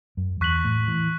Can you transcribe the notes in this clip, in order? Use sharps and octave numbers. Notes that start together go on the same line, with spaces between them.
F#2
E2 C#6 F#6 B6 F#7
A2
E3